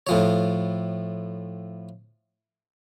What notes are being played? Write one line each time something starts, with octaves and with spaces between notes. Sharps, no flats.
A2 F3 C#5